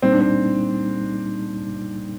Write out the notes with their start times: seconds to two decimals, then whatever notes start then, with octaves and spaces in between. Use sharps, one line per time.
0.02 A#2 G3 A#3 C4 D#4
0.12 D4
0.21 C4